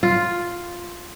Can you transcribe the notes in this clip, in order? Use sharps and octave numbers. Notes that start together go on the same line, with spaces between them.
F4